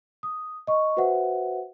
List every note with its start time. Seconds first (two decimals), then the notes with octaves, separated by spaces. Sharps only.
0.23 D#6
0.67 D#5 C#6
0.97 F#4 B4 C5 E5 F#5